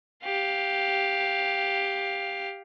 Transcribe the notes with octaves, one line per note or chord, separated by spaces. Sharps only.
G4 F5